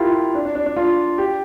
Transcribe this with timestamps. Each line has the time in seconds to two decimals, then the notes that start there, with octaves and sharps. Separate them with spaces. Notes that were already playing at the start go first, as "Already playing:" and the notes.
Already playing: E4 F4 G4 A#4
0.35 D4
0.45 D4
0.55 D4
0.66 D4
0.77 F4
1.18 G4